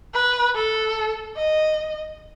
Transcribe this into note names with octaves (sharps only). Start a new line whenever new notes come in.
B4
A4
D#5